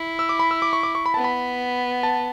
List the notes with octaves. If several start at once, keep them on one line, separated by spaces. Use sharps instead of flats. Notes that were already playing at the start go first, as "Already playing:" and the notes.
Already playing: E4
E6
D6
B5
E6
D6
C#6
D6
C#6
B5
B3 A5
B5
A5